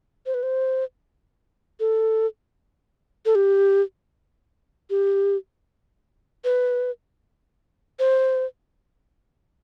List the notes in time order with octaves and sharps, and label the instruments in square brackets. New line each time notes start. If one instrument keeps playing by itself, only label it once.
[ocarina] C5
B4
C5
A4
A4
G4
G4
B4
C5